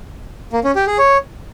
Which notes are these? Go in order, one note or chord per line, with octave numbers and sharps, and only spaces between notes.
A#3
C#4
G4
G#4
C#5